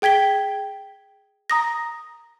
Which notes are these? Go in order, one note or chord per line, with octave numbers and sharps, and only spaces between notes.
G#4 G5 G#6 B6 G7
A#5 D#6 A#6